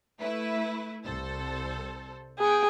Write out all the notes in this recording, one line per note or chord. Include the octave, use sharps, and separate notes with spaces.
A3 E4 B4
C2 A4 C5
B3 G#4 G5